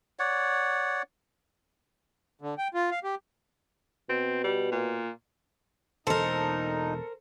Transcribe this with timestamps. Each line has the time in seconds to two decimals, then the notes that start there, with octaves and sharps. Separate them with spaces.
0.19 C#5 D5 F#5
2.41 D3
2.58 G5
2.74 F4
2.91 F5
3.04 G4
4.09 B2 C4
4.44 G3
4.72 A#2
6.07 E1 A#2 D#4 A4 A#4 C5